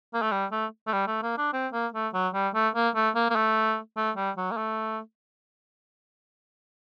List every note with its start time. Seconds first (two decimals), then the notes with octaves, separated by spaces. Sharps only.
0.14 A#3
0.22 A3
0.31 G3
0.52 A3
0.87 A3
0.93 G3
1.07 A3
1.23 A#3
1.38 D4
1.53 C4
1.73 A#3
1.94 A3
2.14 F#3
2.34 G3
2.54 A3
2.75 A#3
2.95 A3
3.15 A#3
3.30 A#3
3.36 A3
3.97 A3
4.16 G3
4.37 F#3
4.51 A#3
4.57 A3